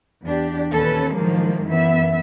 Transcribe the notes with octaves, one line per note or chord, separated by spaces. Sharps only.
E2 D4 G4
D#2 A#2 C#4 A4 B4
A2 D#3 F3 F#3 G#3 A#3
F#2 E3 B3 E5